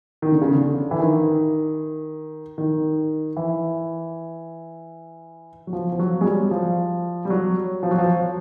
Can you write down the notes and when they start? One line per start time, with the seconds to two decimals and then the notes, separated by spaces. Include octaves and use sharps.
0.22 D#3
0.32 D3
0.41 C#3
0.52 D3
0.91 E3
1.00 D#3
2.58 D#3
3.37 E3
5.67 F#3
5.73 F3
5.92 F3
5.99 F#3
6.21 G#3
6.25 G3
6.51 F3
7.25 G3
7.30 F#3
7.83 F3
7.91 F#3
7.98 F3